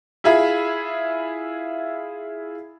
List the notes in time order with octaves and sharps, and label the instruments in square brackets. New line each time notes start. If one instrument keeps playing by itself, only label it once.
[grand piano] E4 F4 G#4 E5 B5